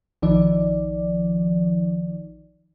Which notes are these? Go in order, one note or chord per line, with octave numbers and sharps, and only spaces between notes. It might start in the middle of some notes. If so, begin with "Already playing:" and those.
A#1 D#3 F3 D#4 D5